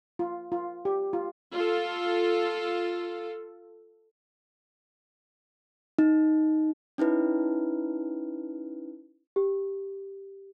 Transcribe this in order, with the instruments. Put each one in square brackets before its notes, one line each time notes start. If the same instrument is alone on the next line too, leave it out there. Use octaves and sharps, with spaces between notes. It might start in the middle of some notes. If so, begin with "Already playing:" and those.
[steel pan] F4
F4
G4
F4
[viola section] F4 A4
[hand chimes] D#4
C#4 D#4 E4 B4
[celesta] G4